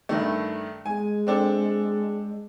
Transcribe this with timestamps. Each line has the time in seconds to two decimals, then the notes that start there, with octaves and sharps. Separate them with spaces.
0.09 G2 D#3 A3
0.86 G#3 G#5
1.27 C4 D4 A4